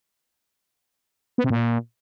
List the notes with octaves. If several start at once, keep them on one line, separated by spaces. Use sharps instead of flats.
B3
C3
A#2